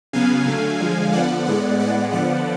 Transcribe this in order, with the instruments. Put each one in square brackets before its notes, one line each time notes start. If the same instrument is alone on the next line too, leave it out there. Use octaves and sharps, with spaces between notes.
[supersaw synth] C#3 F#3 B3 F5 G#5
D3 F#3 A3
D3 F3 G#3
D3 F3 B3 D5 F#5
A2 G#3 B3 D5 F#5
A2 G#3 B3 D5 F#5
D3 F3 B3 D5 F#5